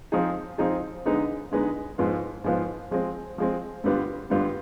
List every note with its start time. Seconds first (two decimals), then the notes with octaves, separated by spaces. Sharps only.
0.12 F3 C4 D#4 G#4
0.58 F3 C4 D#4 G#4
1.06 D3 G#3 B3 D#4
1.52 D3 G#3 B3 D#4
1.98 G#2 F3 B3 F4
2.44 G#2 F3 B3 F4
2.91 F3 G#3 C4
3.38 F3 G#3 C4
3.84 G2 D3 G3 B3 F4
4.30 G2 D3 G3 B3 F4